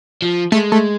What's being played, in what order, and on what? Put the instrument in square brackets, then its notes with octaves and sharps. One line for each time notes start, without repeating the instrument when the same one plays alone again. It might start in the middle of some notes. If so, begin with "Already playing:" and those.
[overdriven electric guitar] F3
[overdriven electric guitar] G#3 [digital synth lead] A3
[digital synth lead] A3